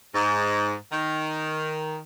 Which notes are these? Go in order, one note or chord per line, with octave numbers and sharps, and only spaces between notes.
G#2
D#3